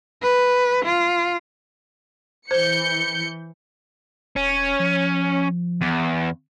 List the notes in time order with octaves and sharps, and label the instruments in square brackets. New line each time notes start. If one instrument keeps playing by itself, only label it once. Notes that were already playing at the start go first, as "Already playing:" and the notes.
[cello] B4
F4
[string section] E3 G6 C#7 [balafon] C5
[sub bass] E1 [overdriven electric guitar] C#4
[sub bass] F3
[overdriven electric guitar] E2